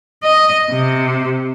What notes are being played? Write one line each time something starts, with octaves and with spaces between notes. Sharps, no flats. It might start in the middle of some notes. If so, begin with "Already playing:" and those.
D#5
C3